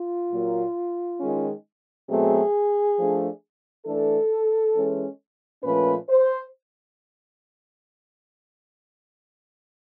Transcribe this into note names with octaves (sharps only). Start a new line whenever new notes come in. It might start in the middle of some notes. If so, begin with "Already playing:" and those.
Already playing: F4
A#2 F#3 A#3
D#3 G#3 C#4
B2 F#3 A3 C4 G#4
F3 A3 D4
E3 A3 D4 A4
E3 G#3 C#4
A#2 F3 A3 C#4 B4
C5